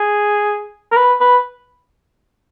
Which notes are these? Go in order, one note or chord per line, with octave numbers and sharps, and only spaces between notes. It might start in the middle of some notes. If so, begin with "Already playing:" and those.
Already playing: G#4
A#4
B4
B4